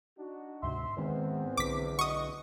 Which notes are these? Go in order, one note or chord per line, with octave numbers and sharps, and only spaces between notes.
D4 D#4 F#4
D2 G#2 C3 E5 C6
E2 G#2 D#3 G#3 B3 C4
B1 D3 D6 B6
E2 F#4 D#5 C#6 D#6